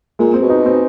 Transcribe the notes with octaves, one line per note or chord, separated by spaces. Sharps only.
A#2 G#3
C4
B2
D#4
C4